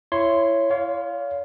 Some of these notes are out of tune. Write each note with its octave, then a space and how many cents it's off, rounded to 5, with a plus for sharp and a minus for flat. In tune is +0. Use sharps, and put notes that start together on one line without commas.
E4 +25 C#5 +0 C6 +0
C#5 +40 F5 +0